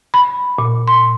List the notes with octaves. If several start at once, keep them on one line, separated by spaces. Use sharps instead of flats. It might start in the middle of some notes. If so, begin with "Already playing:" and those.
B5
A#2
C6